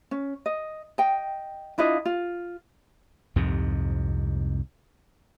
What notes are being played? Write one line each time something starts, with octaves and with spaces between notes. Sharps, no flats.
C#4
D#5
D#5 G5
D4 E4 F4 D#5
F4
C2 F2 G#2 C3